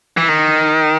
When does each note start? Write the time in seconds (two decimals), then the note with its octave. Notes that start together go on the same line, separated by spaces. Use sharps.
0.17 E3
0.29 D#3